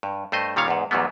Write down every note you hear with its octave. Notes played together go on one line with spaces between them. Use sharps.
G2
G2 A3 C5 D#5
A#2 D#3 G3 C#5 F5
E2 G#2
E2 G#2 F#3 G3 B3